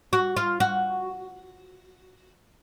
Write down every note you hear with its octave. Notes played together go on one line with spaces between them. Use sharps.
F#4
F4
F#4